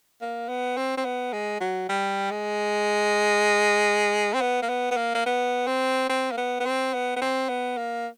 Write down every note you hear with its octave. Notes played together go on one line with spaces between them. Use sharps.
A#3
B3
C4
C4
B3
G#3
F#3
G3
G#3
C4
B3
A#3
B3
B3
A#3
A#3
B3
C4
C4
A#3
B3
B3
C4
B3
B3
C4
B3
A#3